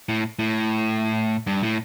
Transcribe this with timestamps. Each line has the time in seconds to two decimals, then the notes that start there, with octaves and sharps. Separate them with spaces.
0.09 A2
0.39 A2
1.47 G2
1.63 A2